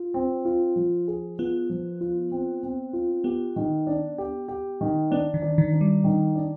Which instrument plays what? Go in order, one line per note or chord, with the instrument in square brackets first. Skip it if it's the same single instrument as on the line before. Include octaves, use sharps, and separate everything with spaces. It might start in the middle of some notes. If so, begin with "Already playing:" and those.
Already playing: [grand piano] F4
C4
F4
F3
G#4
[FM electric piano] B3 [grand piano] F4
[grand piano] F3
F4
C4
C4
F4
[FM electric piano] B3 [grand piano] G4
[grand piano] D#3
D4
G4
G4
D#3
[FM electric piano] B3 [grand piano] D4
[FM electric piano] D#3
[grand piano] D4
[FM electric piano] D#3
[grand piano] D4
[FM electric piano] G3
[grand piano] D#3
D4